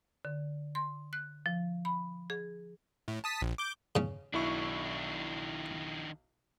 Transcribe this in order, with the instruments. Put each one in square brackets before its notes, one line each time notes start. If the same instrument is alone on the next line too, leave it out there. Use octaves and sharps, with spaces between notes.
[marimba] D3
C6
F#6
F3
B5
G#4
[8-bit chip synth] A2
A5 D#6 B6
A#1
D6 G6
[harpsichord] C#3 C#4
[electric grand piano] B1 E4 C#6 [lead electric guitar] D#3 D4